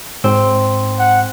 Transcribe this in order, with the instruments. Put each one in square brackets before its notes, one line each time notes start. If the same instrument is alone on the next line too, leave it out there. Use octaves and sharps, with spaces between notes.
[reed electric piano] G#2 [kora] C4
[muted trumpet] F#5